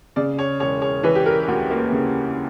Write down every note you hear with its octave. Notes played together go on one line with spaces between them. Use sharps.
C#3 D5
C#5
E1 C#5
C#5
E3 B4
G4
A#4
D2 F#4
A#3
C#3